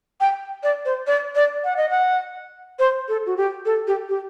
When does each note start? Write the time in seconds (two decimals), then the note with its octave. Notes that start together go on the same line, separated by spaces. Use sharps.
0.21 G5
0.63 D5
0.85 C5
1.07 D5
1.35 D5
1.64 F#5
1.77 D#5
1.90 F#5
2.79 C5
3.08 A4
3.26 F#4
3.37 G4
3.65 A4
3.87 G4
4.09 G4